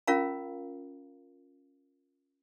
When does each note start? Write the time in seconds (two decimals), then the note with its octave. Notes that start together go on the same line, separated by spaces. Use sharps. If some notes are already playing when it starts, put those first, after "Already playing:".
0.07 C#4 F4 A#4 F5 A#5